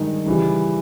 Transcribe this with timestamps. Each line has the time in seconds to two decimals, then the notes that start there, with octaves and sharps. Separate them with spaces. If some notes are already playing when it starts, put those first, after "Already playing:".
Already playing: G2 D#3 G#3 D#4 A#4
0.26 C#3 E3 G3